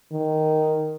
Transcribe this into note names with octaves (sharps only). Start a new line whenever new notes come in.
D#3